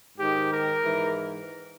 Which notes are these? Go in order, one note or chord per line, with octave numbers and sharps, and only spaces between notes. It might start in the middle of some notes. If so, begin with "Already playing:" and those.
G#2 D#3 G4
A#4
G#2 E3